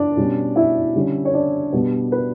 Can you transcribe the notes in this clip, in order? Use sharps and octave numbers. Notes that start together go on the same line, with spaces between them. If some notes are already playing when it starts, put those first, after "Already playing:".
Already playing: D4 D5
B2 G3 C#4
E4 E5
D3 G3 C#4
C#5
D4 D5
B2 G3 B3 D4
B4